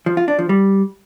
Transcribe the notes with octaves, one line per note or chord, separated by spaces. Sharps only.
F3
F4
D4
F3
G3